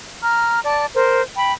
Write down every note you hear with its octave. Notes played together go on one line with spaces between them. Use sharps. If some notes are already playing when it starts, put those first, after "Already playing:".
A#5 F6
D5 A5
A#4 C5
G5 B5